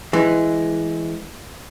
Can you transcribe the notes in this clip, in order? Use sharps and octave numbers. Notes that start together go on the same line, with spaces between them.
E3 G#3